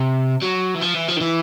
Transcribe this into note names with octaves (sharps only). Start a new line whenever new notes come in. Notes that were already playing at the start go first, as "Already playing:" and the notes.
Already playing: C3
F#3
E3
F3
E3
F3
D#3
E3